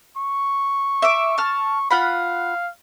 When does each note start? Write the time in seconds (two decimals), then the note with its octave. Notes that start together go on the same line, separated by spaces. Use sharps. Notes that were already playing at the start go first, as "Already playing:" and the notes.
0.17 C#6
1.02 E5 D6
1.38 A5 F6
1.91 F4 F5 F#5 B5